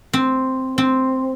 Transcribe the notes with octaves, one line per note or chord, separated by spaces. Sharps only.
C4
C4